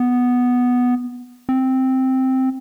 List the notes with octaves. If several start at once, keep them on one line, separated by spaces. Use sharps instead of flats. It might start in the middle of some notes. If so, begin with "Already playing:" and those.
Already playing: B3
C4